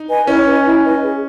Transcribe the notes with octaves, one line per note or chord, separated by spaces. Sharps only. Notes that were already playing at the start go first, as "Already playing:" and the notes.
Already playing: D#4
B4 D#5 G#5
C#4 E4
B4 D#5 G#5
E4
B4 D#5 G#5
G#4